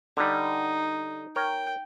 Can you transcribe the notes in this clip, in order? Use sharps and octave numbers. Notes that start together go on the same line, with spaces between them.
D3 G3 D#4
A#4 C#5 G5